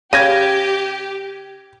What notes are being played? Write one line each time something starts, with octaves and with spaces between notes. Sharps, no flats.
C#3 G4 G#6 A#6 D#7